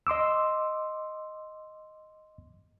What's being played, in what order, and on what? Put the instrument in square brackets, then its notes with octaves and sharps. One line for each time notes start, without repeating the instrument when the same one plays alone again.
[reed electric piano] D#5 C6 D6 E6